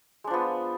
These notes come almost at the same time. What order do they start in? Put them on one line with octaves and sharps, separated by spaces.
G#3 D4 F3 B3